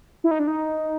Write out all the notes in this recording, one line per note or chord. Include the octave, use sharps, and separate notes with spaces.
E4
D#4
D4
D#4